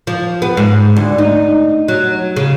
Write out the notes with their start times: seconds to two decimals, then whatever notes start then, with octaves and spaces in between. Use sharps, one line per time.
0.07 F3
0.42 B3
0.57 G#2
0.96 D2
1.18 D#4
1.88 F#3
2.37 C#3